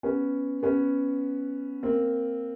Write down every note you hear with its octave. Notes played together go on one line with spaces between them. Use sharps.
B3 C#4
B3 C#4
A#3 C4